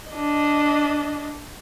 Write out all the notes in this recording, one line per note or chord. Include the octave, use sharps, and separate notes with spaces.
D4 D#5